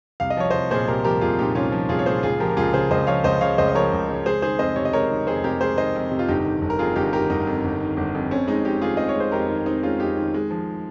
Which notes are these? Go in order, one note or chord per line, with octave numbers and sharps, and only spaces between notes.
C2 F5
D#5
F3 C#5
C2 C5 D#5
A#2 G#4 C5
C2 G4 A#4
F3 G4 A#4
C2 F4 G#4
A#2 D#4 G4
C2 C#4 F4
F3
C2 F4 G#4
C#5
A#2 G#4 C5
C#2 F4 G#4
F3 G4 A#4
A#4
C#2 F4 G#4
C#3 G#4 C5
C#2 C5 D#5
F3 C#5 F5
C#2 C5 D#5
C#3 C#5 F5
C#2 C5 D#5
D#5
F3 A#4 C#5
C#2
C#3
G#3 G#4 C5
D#3 G#4 C5
F2 C5 D#5
C3 C#5
D#5
G#3 A#4 C#5
D#3
F2 G#4 C5
C3 G4 A#4
G#3 G#4 C5
D#3 C5 D#5
F2
C3
F4
G1 D#4 G4
D#3
G1
A#4
F2 F4 G#4
G1 D#4 G4
D#3 G4 A#4
G1 D#4
F2
G1
D#3
G1
F2
C4 C#4
G#3 D#4
F2 D#4 G4
D#3 F4 G#4
C4 D#5
C#5
G#3 C5
F2 G4 A#4
D#3
C4 D#4
G#3 C#4 F4
F2 D#4 G4
D#3
G#3
F3